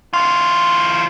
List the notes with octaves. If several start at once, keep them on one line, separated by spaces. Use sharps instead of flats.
E3 F4